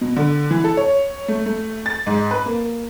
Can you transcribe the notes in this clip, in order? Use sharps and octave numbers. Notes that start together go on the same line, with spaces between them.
B2
D3
E3
A4
C#5
A3
A3
A6
G#2
B4
A#3